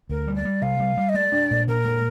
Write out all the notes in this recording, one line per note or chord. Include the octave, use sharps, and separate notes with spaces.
D2 A#4
G3
D5
G3
C3 F5
G3
G3
D#5
G#3 D5
D4
A#2
A#2 A#4
G#3